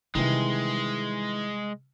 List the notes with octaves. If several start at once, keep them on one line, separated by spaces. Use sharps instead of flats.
C3 D#3 E3 G3 G#3